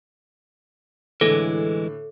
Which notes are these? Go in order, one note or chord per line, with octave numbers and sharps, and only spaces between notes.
A2 D3 E3 G#3 A4